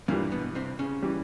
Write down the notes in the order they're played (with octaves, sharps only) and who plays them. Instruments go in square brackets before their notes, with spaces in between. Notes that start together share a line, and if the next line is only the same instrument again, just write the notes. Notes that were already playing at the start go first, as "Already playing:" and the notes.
[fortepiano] G2 E3 G3 [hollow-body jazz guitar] A#2 A#3
[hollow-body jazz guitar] B2 B3
C3 C4
C#3 C#4
[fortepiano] E3 G3